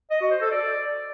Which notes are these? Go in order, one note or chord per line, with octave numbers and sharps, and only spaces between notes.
D#5
F#4
C5
A4
D5